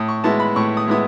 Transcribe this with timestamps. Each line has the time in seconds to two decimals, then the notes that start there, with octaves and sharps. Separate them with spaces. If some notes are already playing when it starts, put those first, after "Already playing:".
Already playing: A2 D#6
0.09 C#6
0.24 G#3 B3 E4 A5
0.40 B5
0.56 A2 C#6
0.77 D#6
0.88 G#3 B3 E4 D#6